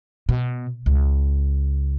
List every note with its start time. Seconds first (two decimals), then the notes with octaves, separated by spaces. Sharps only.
0.29 B2
0.86 C#2